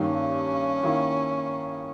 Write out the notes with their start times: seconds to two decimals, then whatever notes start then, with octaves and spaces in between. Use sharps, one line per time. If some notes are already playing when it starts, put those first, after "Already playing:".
Already playing: G2 D#3 A#3 C#4 D#4
0.83 D#3 A#3 E4